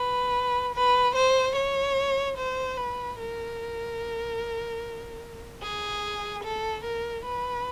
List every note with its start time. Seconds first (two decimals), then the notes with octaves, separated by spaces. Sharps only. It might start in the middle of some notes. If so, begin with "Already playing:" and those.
Already playing: B4
0.75 B4
1.15 C5
1.56 C#5
2.37 C5
2.77 B4
3.19 A#4
5.63 G#4
6.44 A4
6.85 A#4
7.25 B4